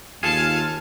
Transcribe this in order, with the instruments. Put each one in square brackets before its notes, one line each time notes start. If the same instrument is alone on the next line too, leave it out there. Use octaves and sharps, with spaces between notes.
[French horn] D#2 [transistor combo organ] F4 [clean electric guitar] G#4 A4 [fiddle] G#5 A5